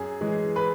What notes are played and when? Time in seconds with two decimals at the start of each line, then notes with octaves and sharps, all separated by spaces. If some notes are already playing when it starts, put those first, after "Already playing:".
Already playing: F#2 G#4
0.21 E3 G#3
0.56 B4